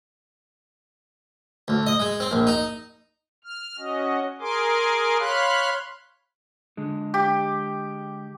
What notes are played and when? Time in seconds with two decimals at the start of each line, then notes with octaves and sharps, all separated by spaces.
1.68 D2
1.87 D#5
2.00 G#3
2.20 C4
2.31 A#1
2.47 D#4
3.44 F6
3.78 C#4 F#4 D#5
4.40 G#4 A#4 G#5 C6 D6
5.20 C#5 F5 B5 C6 F#6
6.77 D3 G#3
7.14 G4